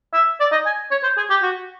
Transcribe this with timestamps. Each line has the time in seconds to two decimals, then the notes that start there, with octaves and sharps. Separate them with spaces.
0.13 E5
0.40 D5
0.52 D#5
0.66 G#5
0.91 C#5
1.03 C5
1.17 G#4
1.30 G4
1.42 F#4